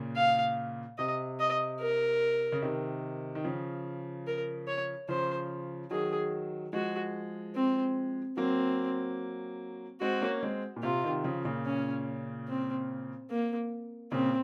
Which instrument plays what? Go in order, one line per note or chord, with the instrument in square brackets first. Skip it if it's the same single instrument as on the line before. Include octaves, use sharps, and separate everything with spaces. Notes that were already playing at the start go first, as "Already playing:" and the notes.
Already playing: [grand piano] A#2 C#3
[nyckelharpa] F5
[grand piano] C3 [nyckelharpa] D#5
[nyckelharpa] D#5
A#4
[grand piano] C#3
C3 D#3
D#3
C#3 F3
[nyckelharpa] A#4
C#5
[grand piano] C#3 F3 [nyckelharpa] C5
[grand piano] D#3 F#3 [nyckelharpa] G#4
[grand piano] F3 G#3 [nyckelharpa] F#4
[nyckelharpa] C4
[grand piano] F#3 A#3 [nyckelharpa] C4
[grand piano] G#3 C4 [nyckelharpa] F#4
[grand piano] A#3 C#4
G#3 C4
A#2
[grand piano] C3 [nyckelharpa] F4
[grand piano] C3 D#3
C#3 F3
A#2 C#3
[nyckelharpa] C#4
C4
A#3
[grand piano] A#2 C#3 [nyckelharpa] C4